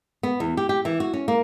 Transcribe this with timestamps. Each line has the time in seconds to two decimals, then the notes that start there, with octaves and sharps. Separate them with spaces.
0.23 B3
0.40 E2
0.57 G4
0.69 G4
0.85 E3
1.00 F#4
1.14 C#4
1.28 A#3